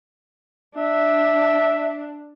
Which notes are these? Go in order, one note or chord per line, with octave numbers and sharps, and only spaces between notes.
D4 E5